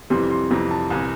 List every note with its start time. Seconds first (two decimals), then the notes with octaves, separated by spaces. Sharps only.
0.10 F2 C3 E3 G3 C6
0.30 C6
0.50 F2 C3 E3 G3 A#5
0.71 A5
0.90 C2 C3 E3 G#5